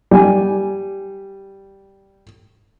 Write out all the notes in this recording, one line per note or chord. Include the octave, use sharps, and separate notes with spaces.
G3 G#5